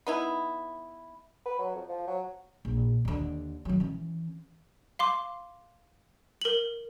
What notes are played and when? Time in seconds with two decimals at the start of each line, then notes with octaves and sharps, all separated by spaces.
0.07 B3 D#4 E4
1.45 B4
1.58 F#3
1.75 F2
1.89 F3
2.07 F#3
2.65 A#1
3.05 D#2 D3
3.65 D#3 F#3
3.80 E3 C#4
4.99 F5 C6 D6
6.41 A#4 F#7